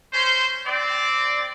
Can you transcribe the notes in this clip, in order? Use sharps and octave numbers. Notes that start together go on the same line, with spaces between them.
C#4 C5
C4 D5